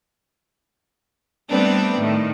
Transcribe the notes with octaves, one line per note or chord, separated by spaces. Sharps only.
G3 A3 B3 C4 D4 B4
A2 D#3 A3